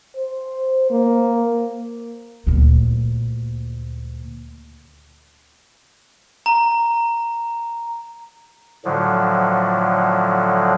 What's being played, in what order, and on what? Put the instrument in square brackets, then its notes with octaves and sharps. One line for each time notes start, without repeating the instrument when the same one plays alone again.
[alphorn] C5
A#3
[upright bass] D2 A#2
[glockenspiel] A#5
[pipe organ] A2 D3 F3 F#3